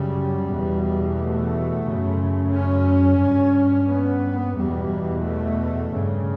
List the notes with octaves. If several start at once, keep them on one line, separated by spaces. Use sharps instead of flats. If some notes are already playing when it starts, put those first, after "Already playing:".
Already playing: F#2 C#3 G3
E2
B2
A3
F#2 C#3
C#4
G2
B3
E2 B2 G3
A3
G2 C#3